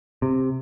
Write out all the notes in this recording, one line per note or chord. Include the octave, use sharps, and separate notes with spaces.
C3